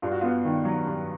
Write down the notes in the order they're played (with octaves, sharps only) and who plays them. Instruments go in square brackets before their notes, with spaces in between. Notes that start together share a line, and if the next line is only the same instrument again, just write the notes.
[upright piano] G2 F4
F#4
B3 F4
D#3
F#3
G2